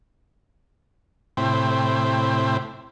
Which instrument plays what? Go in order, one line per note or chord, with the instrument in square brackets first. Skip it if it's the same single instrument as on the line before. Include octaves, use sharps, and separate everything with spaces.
[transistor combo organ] A2 C3 E4 C5 G5